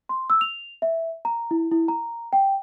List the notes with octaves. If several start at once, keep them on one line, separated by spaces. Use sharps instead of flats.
C6
E6
F7
E5
A#5
E4
E4
A#5
G5